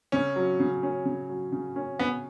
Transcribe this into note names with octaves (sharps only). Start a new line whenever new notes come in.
C#3 C#4
F#3
C#3
C#4
C#3
F#3
C#3
C#4
C#3 B3